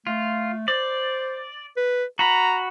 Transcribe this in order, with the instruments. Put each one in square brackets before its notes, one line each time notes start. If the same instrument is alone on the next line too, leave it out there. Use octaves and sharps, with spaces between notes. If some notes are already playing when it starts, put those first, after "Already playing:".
[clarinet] A3 [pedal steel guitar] F4
[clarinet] C5 [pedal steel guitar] D5
[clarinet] B4
[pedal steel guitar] F#4 B5 [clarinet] A#5